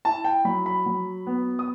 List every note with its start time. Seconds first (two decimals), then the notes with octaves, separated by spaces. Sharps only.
0.05 E4 A5
0.24 G5
0.45 F#3 B5
0.66 B5
0.86 F#3
1.27 B3
1.59 D#6